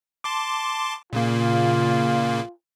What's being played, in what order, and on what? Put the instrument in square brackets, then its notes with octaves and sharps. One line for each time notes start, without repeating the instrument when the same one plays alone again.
[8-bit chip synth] A5 C6 D6
[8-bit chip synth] A#2 C#3 A#3 [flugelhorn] F4